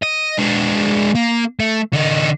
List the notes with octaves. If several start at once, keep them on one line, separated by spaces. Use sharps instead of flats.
D#5
G#3 D4
A#3
A3
D3 D#4